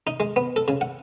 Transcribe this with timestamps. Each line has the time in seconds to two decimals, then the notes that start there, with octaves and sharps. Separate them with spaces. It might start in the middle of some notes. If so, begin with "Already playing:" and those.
0.07 D#4
0.20 G#3
0.36 B3
0.56 A4
0.68 C#3
0.81 F#5